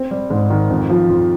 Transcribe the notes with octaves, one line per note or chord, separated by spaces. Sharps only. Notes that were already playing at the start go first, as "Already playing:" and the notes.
Already playing: C4
G3
G#2
D#3
F2
F3
F2